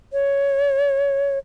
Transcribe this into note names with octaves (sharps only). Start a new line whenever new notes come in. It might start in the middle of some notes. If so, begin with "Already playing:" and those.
C#5